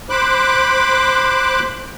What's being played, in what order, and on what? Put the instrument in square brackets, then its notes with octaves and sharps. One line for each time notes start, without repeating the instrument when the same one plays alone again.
[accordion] C5 B5 D6 F#6